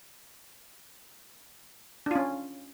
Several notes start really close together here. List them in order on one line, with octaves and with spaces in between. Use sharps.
D4 F4 C#4